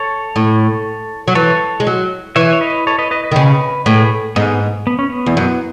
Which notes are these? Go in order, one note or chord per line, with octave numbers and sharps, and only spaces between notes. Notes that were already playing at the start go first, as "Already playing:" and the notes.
Already playing: A4 C#5
A2
F#3
E3 A4 C#5
G#3
F#3
E3 C#5 E5
C#5
B4 D#5
A4 C#5
B4 D#5
B4 D#5
B4 D#5
D#3
C#3
A2 G#4 B4
G#2 B3 D#4
B3
C#4
B3
E2
F#2 B3